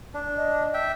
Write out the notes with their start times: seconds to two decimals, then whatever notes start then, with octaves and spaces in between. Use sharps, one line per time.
0.14 D4
0.37 D#5
0.74 E5 G5